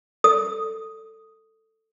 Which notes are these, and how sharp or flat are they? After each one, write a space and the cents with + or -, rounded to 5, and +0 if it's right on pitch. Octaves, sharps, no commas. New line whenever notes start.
A4 +10 D#6 +0